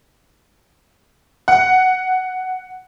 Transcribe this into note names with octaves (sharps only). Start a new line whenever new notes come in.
F#5